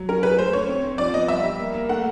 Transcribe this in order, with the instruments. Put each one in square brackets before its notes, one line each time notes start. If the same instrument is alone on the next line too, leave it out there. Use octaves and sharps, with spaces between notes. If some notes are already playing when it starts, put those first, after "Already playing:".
Already playing: [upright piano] F#3
[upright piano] C#4 [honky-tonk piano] A#4
[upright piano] G#4 [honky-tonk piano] B4
[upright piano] A3 [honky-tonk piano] C5
[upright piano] C#4 [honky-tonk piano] C#5
[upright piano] C4
C4
[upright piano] F3 [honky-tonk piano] D5
[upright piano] B3 [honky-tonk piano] D#5
[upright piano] G3 [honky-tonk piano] E5
[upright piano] G3
A#3
A#3
[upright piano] A3 [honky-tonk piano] F#5